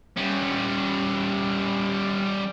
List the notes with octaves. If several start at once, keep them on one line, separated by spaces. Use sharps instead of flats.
G3 C#4